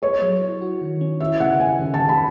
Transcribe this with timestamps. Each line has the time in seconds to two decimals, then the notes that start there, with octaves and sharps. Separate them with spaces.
0.02 G#4 C#5
0.22 F#3
0.41 E4
0.61 F#4
0.81 D#3
1.01 C#4
1.20 E4 E5
1.40 C#3 F#5
1.60 C#4 G#5
1.79 D#3
1.94 A5
2.00 D#3
2.09 B5